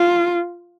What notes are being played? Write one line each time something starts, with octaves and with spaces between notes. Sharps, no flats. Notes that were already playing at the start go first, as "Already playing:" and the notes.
Already playing: F4